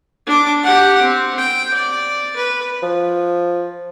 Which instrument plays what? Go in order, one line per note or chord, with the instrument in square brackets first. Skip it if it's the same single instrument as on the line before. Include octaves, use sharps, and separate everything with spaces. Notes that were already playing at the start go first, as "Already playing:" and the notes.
[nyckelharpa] D4 D6
G4 F#5
C4
G5
D5
B4
[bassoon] F3